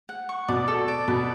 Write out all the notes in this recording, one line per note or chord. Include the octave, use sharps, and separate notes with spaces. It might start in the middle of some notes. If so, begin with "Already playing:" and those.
F#5
C#6
B2 D5
A4
D5
B2 B4